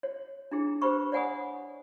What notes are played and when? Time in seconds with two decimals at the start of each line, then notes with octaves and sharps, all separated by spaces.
0.03 C#5
0.51 D4 E4 G#4
0.82 G4 B4 C5 B5 C#6
1.12 C#5 D5 F#5 G#5 B5 D#6